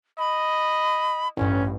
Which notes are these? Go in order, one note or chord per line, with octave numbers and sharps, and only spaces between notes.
D#5 B5
A1 G2 C#4